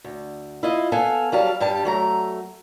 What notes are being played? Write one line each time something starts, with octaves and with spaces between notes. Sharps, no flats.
D2
E4 F4 D#5
B3 A4 F5 G#5
F#3 G3 F5 A5
G2 G3 G4 A5
F#3 A3 A#5